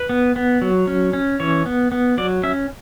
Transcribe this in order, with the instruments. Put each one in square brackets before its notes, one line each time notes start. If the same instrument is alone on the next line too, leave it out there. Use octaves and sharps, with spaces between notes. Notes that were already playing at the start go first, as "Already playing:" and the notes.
Already playing: [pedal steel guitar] B4
B3
B3
F#3
C#4
C#4
E3 C#5
B3
B3
F#3 D5
C#4 E5